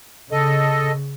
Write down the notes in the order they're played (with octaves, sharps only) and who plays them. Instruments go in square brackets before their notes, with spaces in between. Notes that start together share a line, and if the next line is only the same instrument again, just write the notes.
[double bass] C#3 [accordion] A4 D#5